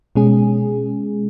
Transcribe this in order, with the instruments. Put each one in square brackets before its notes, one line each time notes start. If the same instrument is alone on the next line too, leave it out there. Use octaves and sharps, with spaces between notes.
[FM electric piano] B2 G#3 C#4 G#4